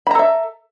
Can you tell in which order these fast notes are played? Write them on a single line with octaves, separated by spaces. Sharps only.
B5 A#5 A4 E5